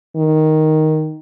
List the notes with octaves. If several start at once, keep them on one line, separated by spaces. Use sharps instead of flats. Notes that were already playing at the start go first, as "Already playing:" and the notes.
D#3